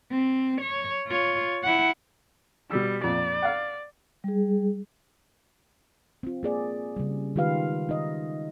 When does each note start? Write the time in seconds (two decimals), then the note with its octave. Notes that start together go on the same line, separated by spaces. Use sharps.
0.11 C4
0.61 C#5
1.08 F4 C#5
1.63 E4 F#5
2.71 B2 G3 E6
3.04 F2 A#2 D5
3.42 F5 F#5
4.24 G3 G#4
6.23 C4 F4
6.43 A#3 G#4 D5
6.97 C#3 G3
7.36 D#3 G#3 F4 G4 B4 F5
7.89 D#4 D#5